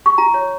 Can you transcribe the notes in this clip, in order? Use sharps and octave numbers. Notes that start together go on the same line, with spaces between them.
C#6
F4 A#5
C#5